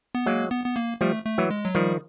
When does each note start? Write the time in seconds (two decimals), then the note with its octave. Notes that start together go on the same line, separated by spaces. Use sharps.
0.15 B3
0.26 F#3 G#3 A#3
0.51 B3
0.65 B3
0.76 A#3
1.01 F3 G3 A3
1.26 A3
1.38 E3 F#3
1.51 G#3
1.65 F#3
1.75 D#3 F3 G3